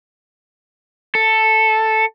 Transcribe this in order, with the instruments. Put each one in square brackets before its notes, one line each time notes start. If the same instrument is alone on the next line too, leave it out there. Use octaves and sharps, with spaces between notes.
[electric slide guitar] A4